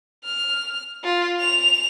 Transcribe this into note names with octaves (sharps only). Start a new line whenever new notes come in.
F6
F4
F7